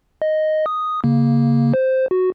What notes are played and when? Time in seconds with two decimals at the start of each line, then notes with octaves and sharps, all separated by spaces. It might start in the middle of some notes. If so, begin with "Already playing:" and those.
0.22 D#5
0.66 D#6
1.04 C#3 A#3
1.74 C5
2.11 F#4